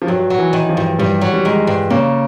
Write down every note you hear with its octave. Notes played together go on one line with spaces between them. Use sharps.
F3
G2 F#3
F#3
E3
D#3
F3
G2
G2 G3
F#3
G3
D#3 G#3
G2
C#3 A#3